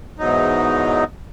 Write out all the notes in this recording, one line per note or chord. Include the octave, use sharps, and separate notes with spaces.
E2 G#2 F#3 D#4